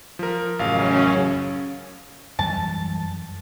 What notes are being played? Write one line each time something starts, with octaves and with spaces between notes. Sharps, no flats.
F3 A#4
A1 F#2 C#3 C#4 F5
F#2 E3 G3 A5